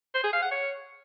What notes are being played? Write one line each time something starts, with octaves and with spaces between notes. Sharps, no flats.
C5
G#4
F5
F#5
C#5